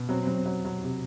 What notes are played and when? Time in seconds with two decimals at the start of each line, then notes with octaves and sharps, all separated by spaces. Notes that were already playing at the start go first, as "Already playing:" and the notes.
Already playing: B2
0.09 F#3 C4
0.22 C4
0.27 F#3
0.34 C4
0.45 F#3
0.65 F#3
0.83 C3